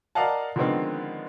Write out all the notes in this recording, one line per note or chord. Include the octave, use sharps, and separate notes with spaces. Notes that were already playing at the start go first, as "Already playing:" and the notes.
A#4 D5 D#5 F5 F#5 A5
D3 D#3 F3 G#3 B3 C4